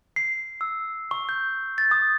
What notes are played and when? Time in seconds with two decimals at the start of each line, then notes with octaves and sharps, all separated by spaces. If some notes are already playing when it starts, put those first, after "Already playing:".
0.16 C7
0.61 E6
1.11 C#6
1.29 G6
1.78 A6
1.91 D#6